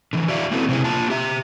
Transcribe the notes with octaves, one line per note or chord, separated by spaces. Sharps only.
D3 E3
F#4 D5 E5 F5
A#3 C4 E4 F#4 A4 B4
C3 C#4 E4 F#4 G#4
A#3 F4 A5
G4 E5